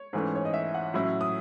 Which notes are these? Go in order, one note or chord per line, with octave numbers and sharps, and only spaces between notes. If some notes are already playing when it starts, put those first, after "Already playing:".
Already playing: C#5
G#2 E3 A3 C#4
C#5
D#5
E5
F#5
A2 F#3 C#4 E4
D#6